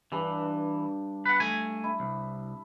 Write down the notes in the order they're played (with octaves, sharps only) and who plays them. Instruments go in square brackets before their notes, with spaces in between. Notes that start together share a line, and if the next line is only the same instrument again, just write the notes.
[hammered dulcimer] G2 D4 D6 [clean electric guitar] E3
[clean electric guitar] B4 F#5
A3 G#5
[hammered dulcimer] E4
[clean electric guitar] C2